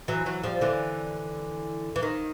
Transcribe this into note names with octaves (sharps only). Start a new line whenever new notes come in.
E3 F#3
E3 F#3
F3 G3
D3 E3
E3
D#3